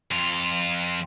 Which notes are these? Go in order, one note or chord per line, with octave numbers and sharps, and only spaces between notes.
F2 F4